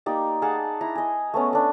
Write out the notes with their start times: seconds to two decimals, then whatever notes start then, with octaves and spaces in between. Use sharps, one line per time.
0.06 A#3 D#4 G4 D5
0.42 G#4 F5 F#5 A5
0.81 E4 A#5
0.95 D#5 G#5
1.34 A3 B3 C#4
1.53 A3 D4